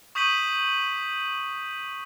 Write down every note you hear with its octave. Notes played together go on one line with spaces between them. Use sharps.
C#6 D#6 G6 B6 D#7 F#7